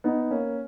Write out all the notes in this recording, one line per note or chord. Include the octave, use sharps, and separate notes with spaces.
B3 D#4
A#3 C#4